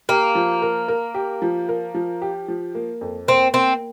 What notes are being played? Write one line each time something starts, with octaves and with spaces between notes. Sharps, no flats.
A#3 G4
F3
A#4
A#4
G4
F3
A#4
F3
G4
F3
A#3
F2
A#3 C4
A#3 C4